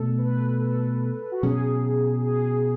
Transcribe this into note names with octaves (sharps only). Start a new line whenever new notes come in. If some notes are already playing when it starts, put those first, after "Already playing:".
Already playing: B2 A3 D4 A4
B4
A4
F#4
B2 F#3 C#4 G#4
G#4